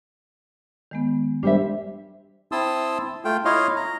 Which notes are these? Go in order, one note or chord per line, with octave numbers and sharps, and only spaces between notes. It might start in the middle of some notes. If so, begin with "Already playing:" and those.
D#3 G#3 B3
G3 G#3 D4 C5 E5
C4 E4 A5 C6 D#6 E6
A3 F4 G5
E4 F4 C#5 D#5 F5 C6
A#5